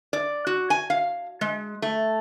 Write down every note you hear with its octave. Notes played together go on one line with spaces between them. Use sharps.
D5
F#4
G#5
F5
G#3
A3